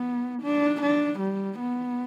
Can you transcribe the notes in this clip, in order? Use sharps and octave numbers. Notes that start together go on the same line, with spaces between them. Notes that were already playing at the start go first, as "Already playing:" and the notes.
Already playing: B3
D4
D4
G3
B3